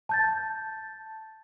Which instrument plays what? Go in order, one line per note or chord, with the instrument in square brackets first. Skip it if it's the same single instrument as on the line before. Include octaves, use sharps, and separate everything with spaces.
[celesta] A5 G6 A6